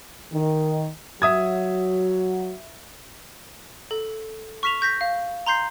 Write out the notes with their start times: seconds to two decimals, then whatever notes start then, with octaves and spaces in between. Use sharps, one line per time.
0.33 D#3
1.22 F#3 F#4 E5 D#6 G#6
3.91 A4
4.63 C#6 F6 B6 E7 F7
4.81 C#6 G6 A#6 B6
5.01 F5
5.46 A#5 C6 G6 C7